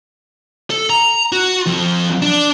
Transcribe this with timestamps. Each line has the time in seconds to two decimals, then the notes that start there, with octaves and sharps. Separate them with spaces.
0.70 A4
0.90 A#5
1.33 F#4
1.67 F2
2.22 D4